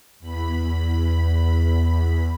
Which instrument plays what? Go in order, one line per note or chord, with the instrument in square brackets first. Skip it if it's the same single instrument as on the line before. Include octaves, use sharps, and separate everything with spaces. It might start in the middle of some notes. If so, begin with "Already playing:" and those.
[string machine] E2 B5